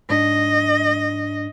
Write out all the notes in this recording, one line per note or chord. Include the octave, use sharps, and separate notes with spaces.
G#2 D4 D#5